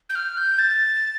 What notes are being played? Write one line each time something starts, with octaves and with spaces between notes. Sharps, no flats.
G6
F6
G6
A6